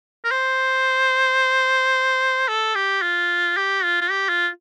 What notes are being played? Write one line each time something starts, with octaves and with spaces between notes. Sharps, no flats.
A#4
C5
A4
G4
F4
G4
F4
F4
G4
F4